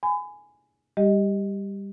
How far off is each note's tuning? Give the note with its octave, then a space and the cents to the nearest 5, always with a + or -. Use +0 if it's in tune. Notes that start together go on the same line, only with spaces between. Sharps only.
G#5 +0 B5 +35
G3 +20 G4 +0 D#5 +0